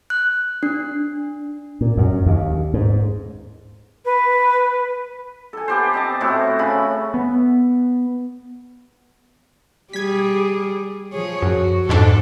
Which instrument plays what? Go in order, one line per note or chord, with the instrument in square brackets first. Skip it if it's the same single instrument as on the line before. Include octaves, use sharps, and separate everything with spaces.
[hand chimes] F#6
D4
[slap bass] A#2
F#2
D#2
G#2
[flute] B4
[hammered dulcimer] A4 G#5
B3 G4 C5
C4 D#5 A5
A2 C4 E4 F#4
C#3 E4 G#5 B5
[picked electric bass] B3
[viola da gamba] G3 G#4 [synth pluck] G#6 B6
[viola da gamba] F3 G#4 C#5
[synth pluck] F#2 [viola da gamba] F#4
[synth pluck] F2 G#2 D4 [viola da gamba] A4